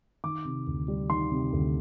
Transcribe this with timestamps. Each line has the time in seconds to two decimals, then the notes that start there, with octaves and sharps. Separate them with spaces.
0.24 D#3 D6
0.45 C3
0.67 D2
0.88 G3
1.10 D#3 C6
1.31 C3
1.53 D2